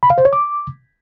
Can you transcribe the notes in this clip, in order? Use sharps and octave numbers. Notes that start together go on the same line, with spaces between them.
B5
F5
C5
C#5
D6